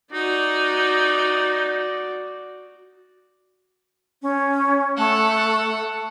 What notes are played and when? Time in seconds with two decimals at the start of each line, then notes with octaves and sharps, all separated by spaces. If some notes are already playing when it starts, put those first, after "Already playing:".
0.13 D#4 F#4 D5
4.22 C#4
4.97 A3 A4 F#5